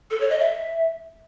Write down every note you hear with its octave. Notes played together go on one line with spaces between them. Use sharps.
A4
C#5
D#5
E5